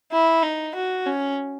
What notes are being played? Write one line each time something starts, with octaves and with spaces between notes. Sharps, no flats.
E4
D#4
F#4
C#4